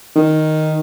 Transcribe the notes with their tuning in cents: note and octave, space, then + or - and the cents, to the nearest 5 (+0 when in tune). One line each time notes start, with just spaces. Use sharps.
D#3 +0